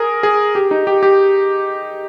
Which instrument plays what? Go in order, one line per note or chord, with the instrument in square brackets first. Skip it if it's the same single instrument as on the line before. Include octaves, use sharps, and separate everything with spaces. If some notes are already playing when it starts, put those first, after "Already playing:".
Already playing: [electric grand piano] G#4 A#4
G#4
G4
D#4
G4
G4